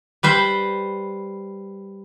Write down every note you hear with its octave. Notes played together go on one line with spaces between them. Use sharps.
G3 B4 C5